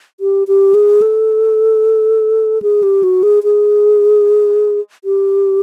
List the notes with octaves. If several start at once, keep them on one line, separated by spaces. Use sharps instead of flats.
G4
G4
G#4
A4
G#4
G4
F#4
G#4
G#4
G4